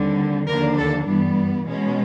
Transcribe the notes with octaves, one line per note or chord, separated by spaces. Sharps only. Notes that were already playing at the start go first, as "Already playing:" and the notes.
Already playing: D#2 D3 G3 C4
D#2 D3 F3 A#3 D4 A#4
A4
G2 E3 G3 B3
B2 G#3 C#4